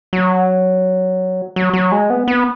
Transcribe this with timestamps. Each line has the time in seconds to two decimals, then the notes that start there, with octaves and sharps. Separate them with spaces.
0.13 F#3
1.56 F#3
1.73 F#3
1.92 G#3
2.10 B3
2.28 B3